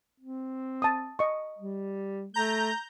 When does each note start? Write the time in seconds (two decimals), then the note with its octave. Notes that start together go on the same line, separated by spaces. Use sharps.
0.20 C4
0.82 A5 D#6
1.19 D#5 C#6
1.58 G3
2.34 A3 A#5 G6